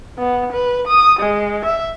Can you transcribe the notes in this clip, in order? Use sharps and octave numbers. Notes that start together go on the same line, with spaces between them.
B3
B4
D#6
G#3
E5